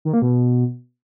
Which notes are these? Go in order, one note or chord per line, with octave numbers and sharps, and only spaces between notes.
D#3
A#3
B2